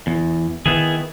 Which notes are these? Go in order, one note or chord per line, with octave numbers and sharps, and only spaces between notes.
E2
D#3 B3 E4 G#4